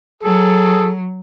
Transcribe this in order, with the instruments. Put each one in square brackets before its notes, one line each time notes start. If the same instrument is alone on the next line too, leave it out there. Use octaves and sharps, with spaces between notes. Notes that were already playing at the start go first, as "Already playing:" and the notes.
[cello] F#3 [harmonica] G#4 A4